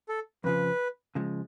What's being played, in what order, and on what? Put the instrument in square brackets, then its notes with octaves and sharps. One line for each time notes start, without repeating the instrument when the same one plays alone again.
[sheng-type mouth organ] A4
[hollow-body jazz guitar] F2 C#3 F3 [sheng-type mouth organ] B4
[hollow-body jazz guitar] C#3 F3 G#3